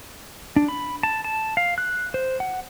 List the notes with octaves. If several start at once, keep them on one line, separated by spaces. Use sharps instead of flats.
D4
B5
A5
A5
F5
F#6
C5
F#5